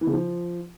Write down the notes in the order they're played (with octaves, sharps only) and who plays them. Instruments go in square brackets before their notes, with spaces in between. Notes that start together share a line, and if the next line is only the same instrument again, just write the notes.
[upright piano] E3
C#3
F3